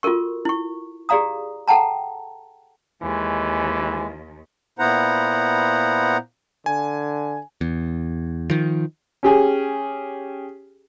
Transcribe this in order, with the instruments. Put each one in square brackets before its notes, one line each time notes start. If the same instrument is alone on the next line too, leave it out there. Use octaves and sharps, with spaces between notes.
[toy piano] F4 F#4 A4 A#4 C#6
E4 C#6
G4 G#4 D5 F5 A#5 D#6
A4 F#5 G5 A5 A#5
[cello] D#2 [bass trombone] E3 [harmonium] G#3
[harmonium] A#2 B3 E4 C5 F#5 A#5
[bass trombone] D3 [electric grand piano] G#5
[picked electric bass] E2
D#3 F3
[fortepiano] C#4 G4 G#4